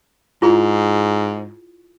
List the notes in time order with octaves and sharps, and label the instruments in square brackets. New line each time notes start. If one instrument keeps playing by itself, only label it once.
[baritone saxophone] G#2 [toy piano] E4 F4 G#4